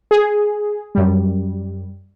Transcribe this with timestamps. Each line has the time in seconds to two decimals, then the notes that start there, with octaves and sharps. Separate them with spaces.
0.11 G#4
0.95 F#2 G3